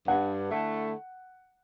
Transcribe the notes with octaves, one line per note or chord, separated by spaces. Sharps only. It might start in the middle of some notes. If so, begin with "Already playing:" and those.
G2 F#5
D3 A3 E4